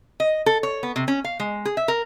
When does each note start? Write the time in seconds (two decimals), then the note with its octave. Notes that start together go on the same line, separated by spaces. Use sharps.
0.20 D#5
0.46 A4
0.63 C#5
0.83 B3
0.96 C3
1.08 C#4
1.24 F5
1.40 G#3
1.65 G#4
1.77 E5
1.88 A#4